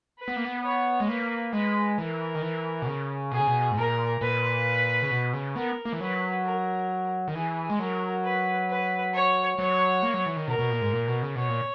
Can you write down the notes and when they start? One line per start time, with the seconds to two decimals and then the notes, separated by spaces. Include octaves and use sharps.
0.19 B4
0.28 B3
0.36 A#3
0.45 B3
0.63 C#5
1.00 G#3
1.08 A#3 B4
1.52 G#3 B4
1.98 E3 A#4
2.35 D#3
2.42 E3
2.82 B2
2.87 C#3
3.32 B2 G#4
3.40 C#3
3.47 B2
3.71 G#2
3.77 A#2 A#4
4.21 A#2 B4
5.02 C#3
5.11 B2
5.33 C#3
5.55 B3 A#4
5.85 A#3
5.93 E3
6.01 F#3 B4
6.45 A#4
7.28 D#3
7.34 E3 G#4
7.70 G#3
7.79 F#3 A#4
8.24 B4
8.69 B4
9.13 C#5
9.58 F#3 C#5
10.03 A#3
10.14 F#3
10.26 E3
10.36 D#3
10.47 B2 A#4
10.59 B2
10.71 A#2
10.81 G#2
10.93 A#2
11.08 B2
11.22 C#3
11.36 B2 C#5
11.48 A#2